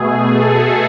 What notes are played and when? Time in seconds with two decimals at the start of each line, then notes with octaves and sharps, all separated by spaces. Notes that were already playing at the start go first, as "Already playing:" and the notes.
Already playing: B2 A3 G#4
0.34 A4